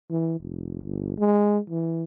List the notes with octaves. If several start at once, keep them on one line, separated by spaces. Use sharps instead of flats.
E3
F1
G1
G#3
E3